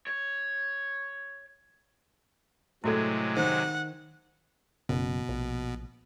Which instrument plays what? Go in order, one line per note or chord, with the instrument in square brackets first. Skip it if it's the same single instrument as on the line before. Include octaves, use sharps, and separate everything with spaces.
[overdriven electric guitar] C#5
[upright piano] A2 G#6 [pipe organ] C3 F#3 G#3 [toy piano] E4 F#4 A4
[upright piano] D#3 [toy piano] C5 [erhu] F#5
[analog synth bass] F#1 [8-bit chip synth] B2
[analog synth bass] A#1